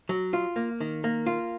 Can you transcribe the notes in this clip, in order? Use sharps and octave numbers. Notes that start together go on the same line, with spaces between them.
F#3
F4
A#3
D#3
A#3
F4